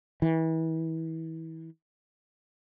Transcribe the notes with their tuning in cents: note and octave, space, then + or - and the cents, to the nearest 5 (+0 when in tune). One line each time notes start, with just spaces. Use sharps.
E3 -30